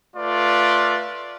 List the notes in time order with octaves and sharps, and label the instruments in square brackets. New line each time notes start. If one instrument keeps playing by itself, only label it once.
[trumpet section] A3 F4 B4 D5